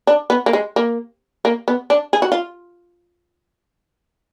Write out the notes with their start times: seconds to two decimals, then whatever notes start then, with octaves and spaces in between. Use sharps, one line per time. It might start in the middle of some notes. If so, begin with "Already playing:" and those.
0.07 D4
0.30 B3
0.46 A#3
0.53 G#3
0.76 A#3
1.45 A#3
1.68 B3
1.90 D4
2.13 G#4
2.22 F#4
2.32 F4